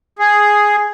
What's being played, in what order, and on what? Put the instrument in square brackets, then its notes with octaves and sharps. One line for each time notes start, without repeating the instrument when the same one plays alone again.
[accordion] G#4